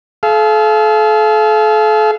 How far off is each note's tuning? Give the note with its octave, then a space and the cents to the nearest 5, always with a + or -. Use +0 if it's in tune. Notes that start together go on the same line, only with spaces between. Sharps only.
A4 -40 F5 -25